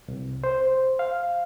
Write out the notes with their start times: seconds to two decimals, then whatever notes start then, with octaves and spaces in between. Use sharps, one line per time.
0.08 C2
0.44 C5
0.99 F5